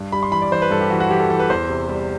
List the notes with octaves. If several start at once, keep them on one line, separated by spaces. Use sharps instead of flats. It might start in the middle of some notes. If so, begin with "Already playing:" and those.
Already playing: G2
G3 B5
C6
E3 B5
D5
E3 C5
B4
G2 A4
G4
E3 F#4
F#4
E3 G4
A4
E3 A4
B4
E2 C5
C3
G3